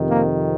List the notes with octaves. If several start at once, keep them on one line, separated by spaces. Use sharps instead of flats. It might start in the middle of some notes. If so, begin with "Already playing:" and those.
Already playing: F2 C3 D#3
A#3